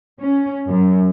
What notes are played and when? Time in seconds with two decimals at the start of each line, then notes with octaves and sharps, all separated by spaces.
0.20 C#4
0.68 F#2